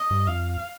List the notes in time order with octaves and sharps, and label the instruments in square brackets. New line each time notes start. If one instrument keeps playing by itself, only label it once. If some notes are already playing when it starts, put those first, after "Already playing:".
Already playing: [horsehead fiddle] D#5
[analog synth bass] G2
[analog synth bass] F2 [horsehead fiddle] F5